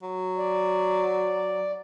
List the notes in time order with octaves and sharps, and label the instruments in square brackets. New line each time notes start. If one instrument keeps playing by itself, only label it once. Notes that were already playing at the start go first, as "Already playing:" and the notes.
[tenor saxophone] F#3
[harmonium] D5